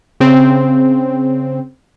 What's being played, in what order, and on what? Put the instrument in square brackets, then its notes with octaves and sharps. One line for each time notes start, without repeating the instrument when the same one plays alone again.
[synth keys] C#3 C4